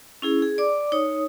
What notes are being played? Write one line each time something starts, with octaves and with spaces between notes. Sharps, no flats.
C#4 E4 G#4
G#4
D5 D6
D#4 C#5 D#6